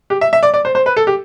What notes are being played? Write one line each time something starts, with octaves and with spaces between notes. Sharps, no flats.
G4
E5
E5
D5
D5
C5
C5
B4
A4
G4